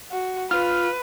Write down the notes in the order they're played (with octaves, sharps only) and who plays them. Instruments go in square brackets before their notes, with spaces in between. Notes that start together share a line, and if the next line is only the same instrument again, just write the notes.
[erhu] F#4
[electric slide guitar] F4 [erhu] B4 [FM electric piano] F6